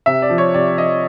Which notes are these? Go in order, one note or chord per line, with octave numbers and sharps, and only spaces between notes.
C3 E5
D5
F3
C#5
C3 D5
F3 D#5